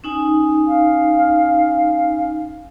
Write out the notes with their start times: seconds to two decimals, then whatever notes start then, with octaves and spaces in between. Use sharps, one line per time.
0.04 C#4 D#4 G#5
0.67 F5